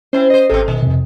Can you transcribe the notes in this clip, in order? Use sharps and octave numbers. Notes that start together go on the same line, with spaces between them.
C4 C#4 E4 C5
C5 D#5
G#1 C3 C4 A4
B2 D#3
F2 C3